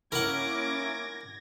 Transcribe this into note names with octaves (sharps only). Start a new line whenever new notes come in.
A#3 C#4 E4 A#4 F#5 D6 G#6 A#6